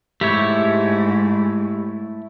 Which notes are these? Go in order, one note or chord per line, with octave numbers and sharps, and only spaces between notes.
G#2 A3 E4 G4 C#5 E5